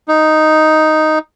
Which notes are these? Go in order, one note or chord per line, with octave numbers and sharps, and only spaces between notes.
D#4